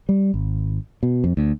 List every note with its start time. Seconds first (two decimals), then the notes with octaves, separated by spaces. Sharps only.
0.09 G3
0.34 G#1
1.03 B2
1.24 F2
1.37 D2